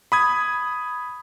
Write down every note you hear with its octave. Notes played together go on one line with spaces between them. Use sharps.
B5 D#6 G#6